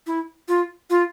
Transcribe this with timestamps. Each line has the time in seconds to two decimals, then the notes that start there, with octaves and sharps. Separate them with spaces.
0.07 E4
0.48 F4
0.90 F4